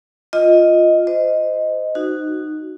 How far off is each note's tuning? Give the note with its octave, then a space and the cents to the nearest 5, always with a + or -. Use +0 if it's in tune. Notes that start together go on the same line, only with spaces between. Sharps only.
F4 +0 D#5 +5
C5 -25 D#5 +0
D#4 -15 F#4 +0